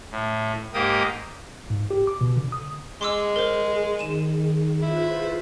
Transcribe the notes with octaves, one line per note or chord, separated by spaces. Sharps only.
A2
G#2 A#3 G4 D#6
G#2
G4
D6
B2
D3
D#6
G#3 G#4 C6 D6 E6
A#4 C5
D#3 D#7 E7
E4 F4 B4 C5